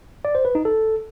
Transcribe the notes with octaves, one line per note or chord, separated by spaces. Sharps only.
D5
C5
B4
D#4
A4